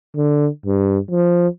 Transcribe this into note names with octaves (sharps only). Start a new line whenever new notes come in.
D3
G2
F3